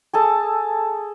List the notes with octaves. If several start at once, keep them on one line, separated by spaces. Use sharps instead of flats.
G#4 A4 A5